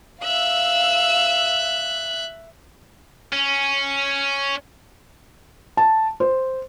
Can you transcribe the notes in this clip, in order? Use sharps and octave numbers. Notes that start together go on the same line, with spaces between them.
E5 F5 E6 F#6
C#4
A5
C5